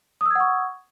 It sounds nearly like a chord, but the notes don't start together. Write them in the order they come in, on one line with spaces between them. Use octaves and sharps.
D#6 E6 G#6 F#5 C#6